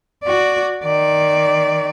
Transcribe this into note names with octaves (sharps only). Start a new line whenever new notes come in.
F#4 D5
D#3 D5